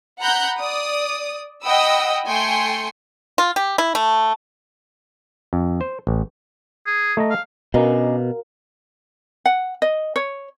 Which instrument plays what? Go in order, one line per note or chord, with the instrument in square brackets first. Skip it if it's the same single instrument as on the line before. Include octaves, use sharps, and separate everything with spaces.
[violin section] F#5 A#5 B5 F#6 G6
D5 D#6
D#5 F#5 G5 B5 D#6 E6
A3 G5 G#5 C6 C#7
[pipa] F4
G4
E4
A3
[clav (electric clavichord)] F2
C5
A1
[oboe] G#4
[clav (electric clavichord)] A3 D#5 A#5
[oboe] F5
[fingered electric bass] B2 [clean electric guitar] C#4 D4 D#5 [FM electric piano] F#4 A#4 F5
[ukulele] F#5
D#5
C#5